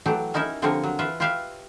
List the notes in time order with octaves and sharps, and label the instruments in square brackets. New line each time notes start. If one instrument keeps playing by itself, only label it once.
[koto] E3 F#3 A3 G4
C#4 D#4 E4 A#4 E5
D3 F3 G3 C4 A#4 C#5
F#3
E3 F4 B4 E5
F4 G4 B4 E5 F5